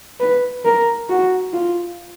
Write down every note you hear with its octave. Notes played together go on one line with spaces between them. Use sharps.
B4
A#4
F#4
F4